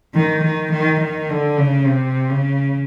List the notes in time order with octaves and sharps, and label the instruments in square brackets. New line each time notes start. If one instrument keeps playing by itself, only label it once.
[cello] D#3
D#3
D#3
D#3
D3
C#3
C3
C#3